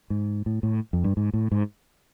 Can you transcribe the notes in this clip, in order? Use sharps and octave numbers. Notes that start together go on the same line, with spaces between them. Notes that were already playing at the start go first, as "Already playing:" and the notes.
G#2
A2
A2
F2
G2
G#2
A2
G#2